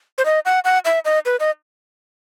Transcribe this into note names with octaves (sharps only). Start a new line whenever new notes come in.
C5
D#5
F#5
F#5
E5
D#5
B4
D#5